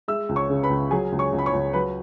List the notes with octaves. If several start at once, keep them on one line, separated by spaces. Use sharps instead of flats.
G#3 E5 E6
C#2
C#5 C#6
C#3
B4 B5
C#2
F#3 G#4 G#5
C#2
C#5 C#6
C#2
B5
C#5 C#6
C#2
F#3 B4 B5